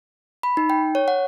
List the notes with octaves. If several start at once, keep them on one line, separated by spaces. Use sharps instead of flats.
B5
D#4
G5
C#5
F#5